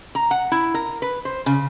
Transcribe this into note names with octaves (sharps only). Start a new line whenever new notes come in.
A#5
F#5
E4
A#4
B4
C5
C#3